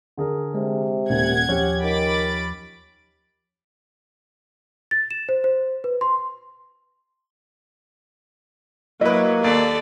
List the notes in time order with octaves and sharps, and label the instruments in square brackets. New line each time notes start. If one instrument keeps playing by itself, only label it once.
[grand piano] D3 G#4 A#4
[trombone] C3 [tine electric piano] G#3
[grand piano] D#1 A#2 [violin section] F#5 G#6
[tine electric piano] D#2 F3 [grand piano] C#4 G4
[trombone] D#3 [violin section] B5 D6 A6
[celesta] A6
E7
C5
C5
B4
C6
[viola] F#3 [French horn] A#3 [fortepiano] E4 B4 [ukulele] D#5
[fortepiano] D#2 [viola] A4 D5